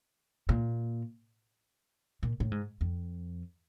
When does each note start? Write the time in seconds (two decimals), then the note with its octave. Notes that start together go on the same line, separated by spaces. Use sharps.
0.49 A#2
2.23 A#2
2.40 A2
2.52 G#2
2.81 F2